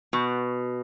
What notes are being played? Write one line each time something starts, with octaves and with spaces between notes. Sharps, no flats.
B2